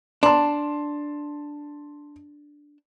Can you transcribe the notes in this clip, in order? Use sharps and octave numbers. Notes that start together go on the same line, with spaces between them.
D4 A5 C6